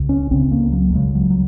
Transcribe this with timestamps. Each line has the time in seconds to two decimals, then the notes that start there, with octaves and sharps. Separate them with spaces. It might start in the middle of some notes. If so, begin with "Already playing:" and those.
Already playing: C#2 C#3
0.09 C#4
0.31 C#2 C#3 C4
0.51 A#3
0.72 F#3
0.93 C#2 C#3 G#3
1.15 F#3
1.30 F#3